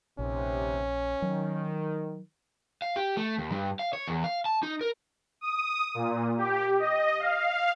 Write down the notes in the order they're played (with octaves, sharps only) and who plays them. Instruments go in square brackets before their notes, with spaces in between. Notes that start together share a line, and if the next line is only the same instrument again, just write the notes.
[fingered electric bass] A#1 [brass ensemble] D#2 C3 [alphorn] C#4
[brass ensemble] D#3 [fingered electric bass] F#3
[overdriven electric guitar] F5
G4
A3
D#2
G2
F5
C#5
E2
F5
A5
D#4
A#4
[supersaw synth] D#6
A#2
G4
D#5
F5